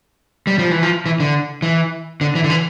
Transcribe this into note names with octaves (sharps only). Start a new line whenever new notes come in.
G3
F3
E3
F3
E3
D3
E3
D3
E3
D3
E3